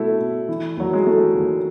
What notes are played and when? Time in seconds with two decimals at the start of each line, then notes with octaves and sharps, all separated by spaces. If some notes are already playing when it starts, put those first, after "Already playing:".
Already playing: B2 A3 E4
0.20 B2
0.49 E3
0.77 D#2 F#3
0.93 G#3
1.06 E3 A3
1.35 D#2